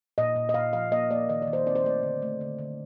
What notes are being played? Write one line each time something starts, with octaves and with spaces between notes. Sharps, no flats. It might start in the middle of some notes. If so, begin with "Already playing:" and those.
A#2 D#5
A#2
D#5
A#2 F5
F3 F5
A#3 D#5
A#3 D5
D#3 D#5
D5
D#3
C5
C4 D5
C5
A3 D5
D3
A3
D3
D3